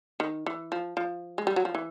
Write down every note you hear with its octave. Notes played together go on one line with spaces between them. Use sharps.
D#3
E3
F3
F3
G#3
G3
F#3
F3
E3